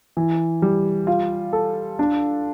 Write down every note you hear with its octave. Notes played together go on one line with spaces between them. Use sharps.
E3
G3
F4
A4
D4